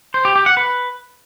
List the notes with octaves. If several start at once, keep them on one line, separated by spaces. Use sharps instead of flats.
C5
G4
G4
F#5
B4